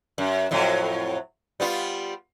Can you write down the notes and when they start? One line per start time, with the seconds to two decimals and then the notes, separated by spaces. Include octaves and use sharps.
0.18 F#2
0.51 F2 A2 F#3
1.60 G3 B3 F4